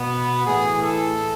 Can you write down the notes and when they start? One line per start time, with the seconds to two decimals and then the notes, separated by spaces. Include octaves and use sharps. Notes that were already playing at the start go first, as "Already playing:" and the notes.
Already playing: B2 B3
0.45 A2 E3 G#4
0.81 A4